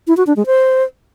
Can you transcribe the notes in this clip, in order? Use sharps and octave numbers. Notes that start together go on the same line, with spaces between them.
E4
F#4
D4
G#3
C5